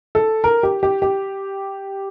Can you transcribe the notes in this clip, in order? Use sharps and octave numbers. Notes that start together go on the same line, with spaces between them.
A4
A#4
G4
G4
G4